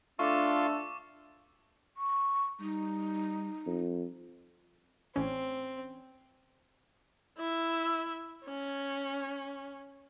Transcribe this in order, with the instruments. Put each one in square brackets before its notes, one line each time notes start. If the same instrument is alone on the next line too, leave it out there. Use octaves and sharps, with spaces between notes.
[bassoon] A3 [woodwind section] D4 A4 [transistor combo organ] F4 [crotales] C#6 D6
[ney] C#6
[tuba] G3 [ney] D#4
[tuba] F2
[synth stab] A1 C#4 [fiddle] C4
[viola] E4 E5
C#4